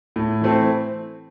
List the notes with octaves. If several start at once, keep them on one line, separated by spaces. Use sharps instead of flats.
A2
E3 A3 C4 E4